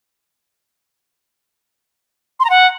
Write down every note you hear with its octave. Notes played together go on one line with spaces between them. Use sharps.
C6
A#5
F#5